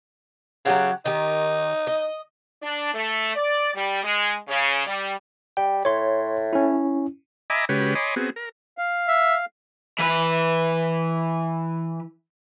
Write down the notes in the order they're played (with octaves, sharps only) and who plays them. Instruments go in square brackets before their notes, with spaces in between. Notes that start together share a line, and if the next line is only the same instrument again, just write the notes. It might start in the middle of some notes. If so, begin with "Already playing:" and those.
[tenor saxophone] C#3 [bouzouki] F#3 G4 F#5
[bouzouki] D#3 G4 [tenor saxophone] D#4
[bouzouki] D#5
[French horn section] D4
A3
D5
G3
G#3
C#3
G3
[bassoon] G3 [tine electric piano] G5
[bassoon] A2 [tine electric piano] C#5 C6
[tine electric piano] C#4 E4
[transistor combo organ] D#5 E5 G#5 A#5 B5 D6
C#3 G#3 F#4 G4 B4 C#5
C#5 D#5 G#5 B5 C6 D6
B3 C4 F#4 G#4
A#4
[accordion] F5
[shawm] E5
[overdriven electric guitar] E3 B4